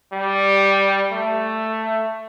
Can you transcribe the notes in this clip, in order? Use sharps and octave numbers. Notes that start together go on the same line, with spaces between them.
G3
A3